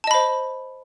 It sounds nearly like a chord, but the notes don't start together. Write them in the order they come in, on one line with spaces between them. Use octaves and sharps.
A5 D#5 B5 C5